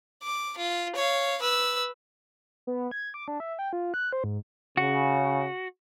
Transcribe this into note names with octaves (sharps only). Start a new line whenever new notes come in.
D6
F4
C#5 F5
B4 E6
B3
G#6
D6
D4
E5
G5
F4
F#6
C5
G#2
C#3 F#4